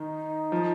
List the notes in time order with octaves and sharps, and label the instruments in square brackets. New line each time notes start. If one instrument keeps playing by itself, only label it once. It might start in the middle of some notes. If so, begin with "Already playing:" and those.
Already playing: [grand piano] D#3 [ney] D#4
[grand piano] F3